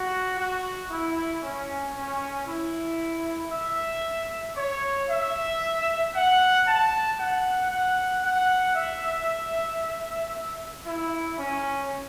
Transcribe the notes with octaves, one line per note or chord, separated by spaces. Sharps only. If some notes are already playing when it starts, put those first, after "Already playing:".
Already playing: F#4
F#4
E4
C#4
C#4
E4
E5
C#5
E5
F#5
A5
F#5
F#5
F#5
E5
E4
C#4